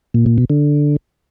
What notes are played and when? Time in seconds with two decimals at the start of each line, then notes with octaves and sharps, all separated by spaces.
0.14 A#2
0.26 A#2
0.38 B2
0.50 D3